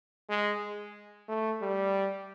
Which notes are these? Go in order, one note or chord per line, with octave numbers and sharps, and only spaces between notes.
G#3
A3
G3